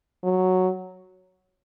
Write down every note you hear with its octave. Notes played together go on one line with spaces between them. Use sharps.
F#3